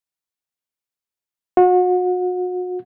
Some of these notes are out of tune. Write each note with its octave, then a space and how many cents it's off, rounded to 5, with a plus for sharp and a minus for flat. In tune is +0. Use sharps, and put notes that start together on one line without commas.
F#4 -35